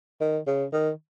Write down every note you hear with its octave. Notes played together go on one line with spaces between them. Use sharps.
D#3
C#3
D#3